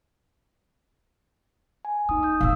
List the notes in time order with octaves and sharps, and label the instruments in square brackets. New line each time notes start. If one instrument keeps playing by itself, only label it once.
[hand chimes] G#5
[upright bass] A#3 [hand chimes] D#4 D#6
[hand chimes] D#6 G6
[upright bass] A2 C#3 [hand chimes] F5 E6